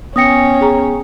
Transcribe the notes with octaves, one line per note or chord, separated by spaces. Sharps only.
B3 C#4 G5 D#6 A#6 C#7
G#4 A#5